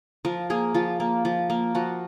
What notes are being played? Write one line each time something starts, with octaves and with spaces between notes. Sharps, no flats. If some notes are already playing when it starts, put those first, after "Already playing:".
F3 A#4
A#3 G#4
F3 F4
A#3
F3
A#3
F3 F#4